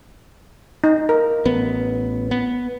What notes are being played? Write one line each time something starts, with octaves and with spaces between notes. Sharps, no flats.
D#4
A#4
A1 B3
B3